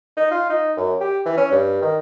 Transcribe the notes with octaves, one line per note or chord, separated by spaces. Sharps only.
D#4
F4
D#4
F#2
G4
E3
C#4
G2
D#3